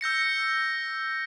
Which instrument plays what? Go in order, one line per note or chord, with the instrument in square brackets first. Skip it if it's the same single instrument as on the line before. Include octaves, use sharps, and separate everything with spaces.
[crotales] E6 G6 A#6 C#7